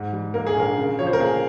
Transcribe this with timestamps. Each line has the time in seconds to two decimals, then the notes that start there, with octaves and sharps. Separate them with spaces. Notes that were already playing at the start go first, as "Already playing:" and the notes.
Already playing: G#2
0.13 G3
0.34 A#3 A#4
0.47 G#4
0.56 A#1 A#4
0.77 C#3
0.99 F3 C#5
1.06 C5
1.13 A#4
1.20 A#3 G#4